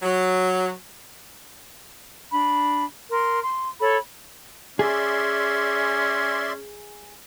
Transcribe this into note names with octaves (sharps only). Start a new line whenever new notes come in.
F#3
D4 B5
A#4 C6
C6
A4 C#5 B5
C#4 G#4 D5 E5 C6